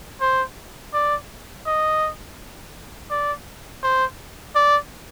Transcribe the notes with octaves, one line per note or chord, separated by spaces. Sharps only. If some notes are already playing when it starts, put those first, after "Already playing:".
C5
D5
D#5
D5
C5
D5